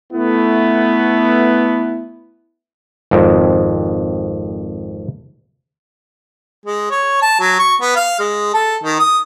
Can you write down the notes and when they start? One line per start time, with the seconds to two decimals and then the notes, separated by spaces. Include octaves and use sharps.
0.12 A3 B3 E4
3.11 G#1 F2
6.66 G#3
6.91 C#5
7.22 A5
7.40 F#3
7.59 C#6
7.81 B3
7.96 F5
8.19 G#3
8.54 A4
8.84 D#3
8.99 D#6